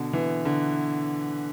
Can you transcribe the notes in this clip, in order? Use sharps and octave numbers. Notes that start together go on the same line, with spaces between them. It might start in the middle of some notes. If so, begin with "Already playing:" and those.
Already playing: B2 D3
E3
D3